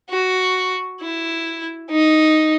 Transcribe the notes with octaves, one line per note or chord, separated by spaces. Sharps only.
F#4
E4
D#4